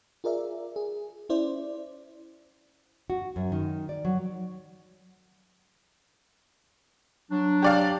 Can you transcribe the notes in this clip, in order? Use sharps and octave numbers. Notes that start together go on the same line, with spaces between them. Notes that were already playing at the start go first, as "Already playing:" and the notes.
F4 G#4 A#4 D5 E5
G#4
C#4 E4 C5 D5
F#4
F#2
D#3
D5
F#3
F#3 D4
G4 D5 F5